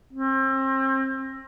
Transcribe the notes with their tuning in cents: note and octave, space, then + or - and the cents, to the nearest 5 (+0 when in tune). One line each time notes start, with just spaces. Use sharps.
C4 +35